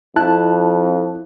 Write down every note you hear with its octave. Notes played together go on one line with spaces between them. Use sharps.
F2 E4 A5 F#6